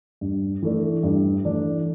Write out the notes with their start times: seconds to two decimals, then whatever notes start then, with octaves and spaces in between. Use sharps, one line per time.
0.21 G2
0.63 E3 A3 D4
1.03 G2
1.45 E3 A3 D4